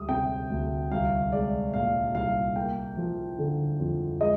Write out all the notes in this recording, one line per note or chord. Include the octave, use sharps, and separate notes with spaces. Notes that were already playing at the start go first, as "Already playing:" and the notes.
Already playing: D2 G3 D#6
C3 G5
D2
C2 F5
G#3 D5
A#2 F5
C2 F5
A#3 G5
F3
D3
F2
G#3 D#5